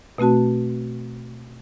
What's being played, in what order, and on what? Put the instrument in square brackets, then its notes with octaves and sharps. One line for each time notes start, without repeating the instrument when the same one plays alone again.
[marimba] B2 A3 C4 F#4 A5